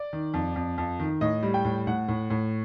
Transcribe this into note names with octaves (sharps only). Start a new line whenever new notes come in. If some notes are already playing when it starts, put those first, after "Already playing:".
Already playing: D5
D#3
F2
F2
F2
D#3
A2 D#5
G3
G5
A2
A2 F#5
A2
A2